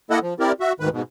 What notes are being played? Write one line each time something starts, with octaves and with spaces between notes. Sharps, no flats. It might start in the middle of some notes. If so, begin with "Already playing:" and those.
A#3 E4 A4 D#5 F#5
F3
C4 E4 G4 A#4 D5
F#4 E5
D2 G#2 D#3 B4
G#2 B2